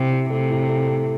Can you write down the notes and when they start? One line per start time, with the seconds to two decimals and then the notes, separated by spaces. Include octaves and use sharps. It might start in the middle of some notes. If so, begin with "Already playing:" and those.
Already playing: C3 E4
0.12 E4
0.30 C3 A3
0.49 A2
0.69 A3
0.87 A3